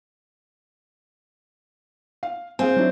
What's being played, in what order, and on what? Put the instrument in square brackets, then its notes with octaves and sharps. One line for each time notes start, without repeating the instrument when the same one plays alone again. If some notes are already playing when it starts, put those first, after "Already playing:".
[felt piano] F5
[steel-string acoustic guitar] C4 [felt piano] G#4 F5 G#5
[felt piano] F#3 D4 E4